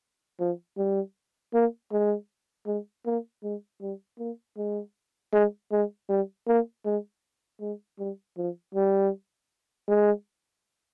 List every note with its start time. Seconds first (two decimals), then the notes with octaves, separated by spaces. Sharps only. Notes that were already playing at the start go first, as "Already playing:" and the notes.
0.40 F3
0.78 G3
1.54 A#3
1.92 G#3
2.66 G#3
3.06 A#3
3.43 G#3
3.81 G3
4.19 A#3
4.57 G#3
5.33 G#3
5.71 G#3
6.09 G3
6.47 A#3
6.85 G#3
7.60 G#3
7.98 G3
8.37 F3
8.74 G3
9.88 G#3